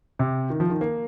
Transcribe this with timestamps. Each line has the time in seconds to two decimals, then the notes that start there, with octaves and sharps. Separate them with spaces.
0.19 C3
0.50 D#3
0.60 F3
0.70 D#3
0.81 A#3